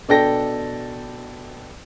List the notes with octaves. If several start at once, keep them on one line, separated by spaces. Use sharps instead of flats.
B2 D4 A4 G5 A#6